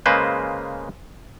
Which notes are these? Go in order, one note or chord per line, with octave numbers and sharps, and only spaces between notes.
C#3 G#3 A#3 B4 C5